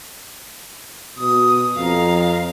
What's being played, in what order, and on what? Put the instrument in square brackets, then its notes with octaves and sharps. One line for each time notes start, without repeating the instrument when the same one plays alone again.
[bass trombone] B2 [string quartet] D#6
[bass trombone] F2 [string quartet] F5 A#5